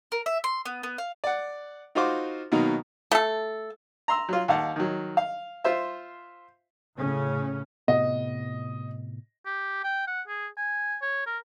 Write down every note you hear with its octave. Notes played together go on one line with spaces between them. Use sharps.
A#4
E5
C6
B3
B3
F5
D5 F#5
D#4 F4 F#4 C5 C6 D6
B2 D#3 F#3 A#3 D#4
A3 A4
A#5 C6 E6
F#3 F4
D#2 F5 F#5 A5
D#3 F#3
F5
F4 C5 E5
A2 C#3 C#4
A2 C3 B3 D#5
G4
G5
F#5
G#4
G#5
C#5
A#4